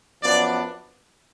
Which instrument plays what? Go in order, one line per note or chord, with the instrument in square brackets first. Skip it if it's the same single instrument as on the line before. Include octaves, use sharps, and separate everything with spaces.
[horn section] F#2 F3 B3 D4 D5